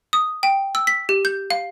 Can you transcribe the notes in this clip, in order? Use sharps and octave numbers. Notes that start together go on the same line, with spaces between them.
D#6
G5
E6
B6
G4
G6
F5